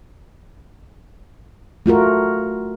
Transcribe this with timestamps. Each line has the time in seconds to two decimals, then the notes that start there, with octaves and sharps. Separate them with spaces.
1.86 A3 F4 F#4 A#4